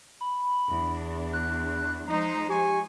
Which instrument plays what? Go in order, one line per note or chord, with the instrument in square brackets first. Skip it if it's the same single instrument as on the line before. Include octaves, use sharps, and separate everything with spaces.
[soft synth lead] B5
[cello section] E2 D4
[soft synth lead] F#6
[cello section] F3 G#3 C5 [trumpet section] D#4 [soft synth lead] A#5
[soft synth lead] G4 [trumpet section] G#5 C#6